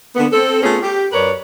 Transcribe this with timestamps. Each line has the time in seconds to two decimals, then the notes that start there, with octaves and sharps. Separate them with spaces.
0.16 D3 A#3 B3
0.32 C4 A4
0.62 A3 B3 C#4 F4 G#4
0.82 G4
1.12 F#2 A#4 B4 C#5 D5